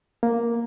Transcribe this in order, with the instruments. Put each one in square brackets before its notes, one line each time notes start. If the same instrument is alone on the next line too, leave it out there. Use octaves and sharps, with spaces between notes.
[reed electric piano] A#3